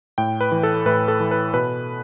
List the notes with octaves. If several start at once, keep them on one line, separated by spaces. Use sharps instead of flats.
A2 G5
B4
E3
A4
A2 B4
A4
E3
B4
B2 B4